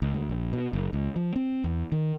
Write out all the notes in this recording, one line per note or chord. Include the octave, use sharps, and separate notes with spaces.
C#2
D2
A#1
B2
F#1
C#2
F3
C4
E2
D#3